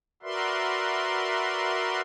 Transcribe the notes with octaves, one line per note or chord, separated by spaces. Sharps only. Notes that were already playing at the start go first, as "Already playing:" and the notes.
F#4 A#4 B4 D5 E5 C6